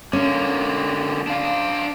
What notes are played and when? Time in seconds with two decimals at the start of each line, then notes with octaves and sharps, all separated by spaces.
0.13 D3 A#3 C#4
1.27 D4 F5